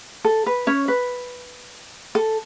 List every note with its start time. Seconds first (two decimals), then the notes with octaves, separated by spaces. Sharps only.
0.25 A4
0.46 B4
0.67 C#4 C#5
0.88 B4
2.15 A4